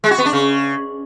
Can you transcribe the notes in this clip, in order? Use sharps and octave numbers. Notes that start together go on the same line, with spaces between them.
G#3
F#4
B3
D4
C#3